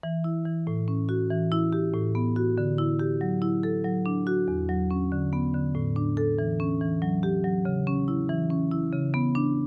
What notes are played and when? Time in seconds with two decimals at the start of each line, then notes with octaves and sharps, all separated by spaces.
0.03 E3
0.24 E4
0.45 E3
0.67 A2
0.88 C#4
1.09 F#4
1.30 E3
1.52 E4
1.73 G4
1.94 A2
2.15 B3
2.36 F#4
2.58 D3
2.78 E4
2.99 G4
3.21 F#3
3.42 E4
3.63 A4
3.84 F#3
4.06 D4
4.27 F#4
4.48 E2
4.69 F#3
4.91 C#4
5.12 D3
5.33 B3
5.54 D3
5.75 A2
5.96 D4
6.17 A4
6.39 E3
6.60 C#4
6.81 E3
7.02 F#3
7.23 G4
7.44 F#3
7.65 C#3
7.87 C#4
8.08 E4
8.29 E3
8.50 C#4
8.71 E4
8.93 C#3
9.14 B3
9.35 D4